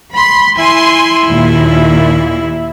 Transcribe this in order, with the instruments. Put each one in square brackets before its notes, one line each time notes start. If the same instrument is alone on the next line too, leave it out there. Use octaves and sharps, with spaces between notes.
[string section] B5 C6
[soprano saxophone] E4 [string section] G#5 C6
[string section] D#2 A#2